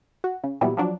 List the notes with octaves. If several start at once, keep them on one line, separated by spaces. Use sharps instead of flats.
F#4
C#3
A#2 E3 F#3 G3 B3 E4
F3 F#3 D4